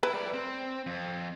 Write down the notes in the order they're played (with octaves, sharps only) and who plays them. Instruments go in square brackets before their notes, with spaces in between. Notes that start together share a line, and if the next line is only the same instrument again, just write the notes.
[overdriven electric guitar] E4 [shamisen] B4
[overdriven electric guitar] G3 D5
C4
F2